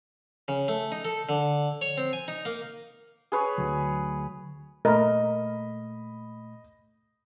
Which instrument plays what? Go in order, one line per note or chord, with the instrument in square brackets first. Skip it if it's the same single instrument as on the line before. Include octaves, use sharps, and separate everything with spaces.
[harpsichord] C#3
A3
D#4
A4
D3
C#5
C4
G#5
D#4
A#3
[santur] G#4 B4 C#5
[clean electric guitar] D2 F#3
[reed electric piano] A#2 A3 [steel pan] A#4 [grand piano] D#5 B5